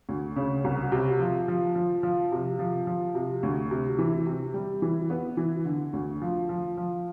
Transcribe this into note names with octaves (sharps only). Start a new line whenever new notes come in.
D2
C#3
C2
C3
F3
F3
F3
F3
C3
F3
F3
C3
D2
C3
E3
C3
G3
E3
B3
E3
D3
D2
F3
F3
F3